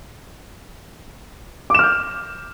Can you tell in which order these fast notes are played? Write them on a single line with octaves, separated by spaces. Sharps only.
D6 E7 F6 G6